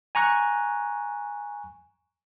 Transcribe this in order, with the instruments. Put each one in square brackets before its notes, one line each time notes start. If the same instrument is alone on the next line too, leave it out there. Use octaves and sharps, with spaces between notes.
[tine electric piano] G#5 A#5 C#6 F#6